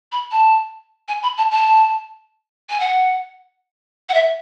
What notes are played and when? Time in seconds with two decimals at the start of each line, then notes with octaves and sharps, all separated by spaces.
0.12 B5
0.31 A5
1.08 G#5
1.22 B5
1.37 A5
1.51 A5
2.70 G#5
2.80 F#5
4.09 F#5
4.14 E5